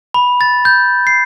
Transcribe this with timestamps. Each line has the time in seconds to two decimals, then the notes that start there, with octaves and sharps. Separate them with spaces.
0.14 B5
0.41 A6
0.65 G6
1.07 C7